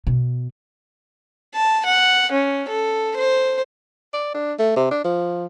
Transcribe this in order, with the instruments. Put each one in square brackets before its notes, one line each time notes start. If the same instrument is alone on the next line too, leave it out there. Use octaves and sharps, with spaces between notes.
[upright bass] B2
[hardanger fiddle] A5
F#5
C#4
A4
C5
[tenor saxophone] D5
D4
A3
C3
D4
F3